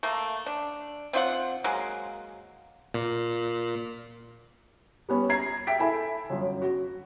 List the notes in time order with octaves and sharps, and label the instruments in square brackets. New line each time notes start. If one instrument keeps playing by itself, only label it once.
[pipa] A3 A#3
D4
C4 F4 D5 F#5
F#3 G#3 A#3
[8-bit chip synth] A#2
[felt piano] G3 B3 C#4
A#5 G#6 C7
E5 G5 B6 D7
E4 A4 E5 G#5 B5
G1 F#2
F#4